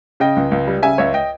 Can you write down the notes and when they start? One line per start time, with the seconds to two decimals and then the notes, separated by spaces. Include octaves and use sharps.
0.20 C#3 D#5 G5
0.36 C#2
0.51 C#2
0.67 G3
0.83 C#3 E5 G#5
0.98 C#2 C#5 E5
1.14 D#5 G5